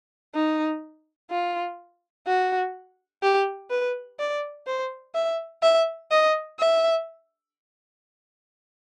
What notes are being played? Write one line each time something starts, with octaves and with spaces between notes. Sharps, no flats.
D#4
F4
F#4
G4
B4
D5
C5
E5
E5
D#5
E5